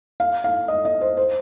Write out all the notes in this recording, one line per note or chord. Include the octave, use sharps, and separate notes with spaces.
F5
F5
D#5
D#5
C5
C5